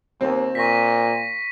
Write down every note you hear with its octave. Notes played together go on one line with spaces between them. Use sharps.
D#2 C4
A#2 C#6 A#6 B6